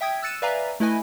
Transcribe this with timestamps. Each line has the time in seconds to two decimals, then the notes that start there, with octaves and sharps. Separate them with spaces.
0.01 E5 G5 D#6 G#6
0.22 E6 F#6 A6 C#7 D#7 E7
0.42 B4 D5 E5 F5 G#5 A#5
0.80 A3 E4 B4 D#5 G#5